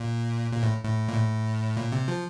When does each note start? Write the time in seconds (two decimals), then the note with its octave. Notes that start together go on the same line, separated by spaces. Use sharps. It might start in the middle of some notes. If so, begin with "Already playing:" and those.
Already playing: A#2
0.52 A#2
0.63 A2
0.84 A2
1.08 A#2
1.14 A2
1.77 A#2
1.92 C3
2.08 F3